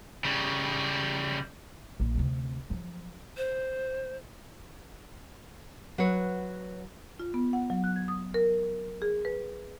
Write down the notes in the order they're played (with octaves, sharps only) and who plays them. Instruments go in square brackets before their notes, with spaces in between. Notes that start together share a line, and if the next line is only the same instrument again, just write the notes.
[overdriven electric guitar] C#3 G3
[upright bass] A#1
D2 C3
F3 F#3
[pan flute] C5
[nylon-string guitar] F#3 B4 C#5
[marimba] F4
B3
F#5
F#3
F#6
G#6
D#6
A#4
G#4
B4